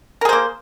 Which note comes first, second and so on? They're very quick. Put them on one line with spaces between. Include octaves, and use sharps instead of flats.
A#4 G#4 C5 A#3